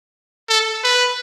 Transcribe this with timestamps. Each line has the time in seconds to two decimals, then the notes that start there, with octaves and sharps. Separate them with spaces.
0.49 A4
0.84 B4